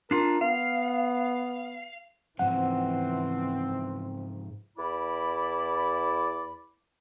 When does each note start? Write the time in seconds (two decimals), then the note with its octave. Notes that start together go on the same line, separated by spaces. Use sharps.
0.11 D4 F4 A#4
0.41 B3 F5
2.39 G#2 E3 F3 C4 F#5
4.77 E2 E4 D5 B5